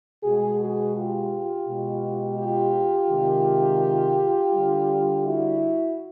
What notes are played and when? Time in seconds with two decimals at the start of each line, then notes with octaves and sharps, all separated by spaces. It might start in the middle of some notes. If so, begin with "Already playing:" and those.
0.23 B2 G#3 F#4 G#4
0.59 F#4 G#4
0.94 F4 G4
1.66 B2 G#3
2.38 F4 G4
3.10 C3 D#3 G#3
4.53 D3 G3
5.24 E4 F#4